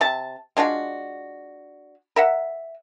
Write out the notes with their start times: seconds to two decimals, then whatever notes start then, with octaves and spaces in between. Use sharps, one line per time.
0.01 C3 A5
0.57 G#3 D4 F4 F#4
2.16 A#4 E5 F#5